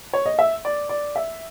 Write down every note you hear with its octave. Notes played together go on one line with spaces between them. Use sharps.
C#5
D#5
E5
D5
D5
E5